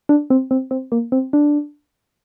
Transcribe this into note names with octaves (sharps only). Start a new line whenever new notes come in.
D4
C4
C4
C4
A#3
C4
D4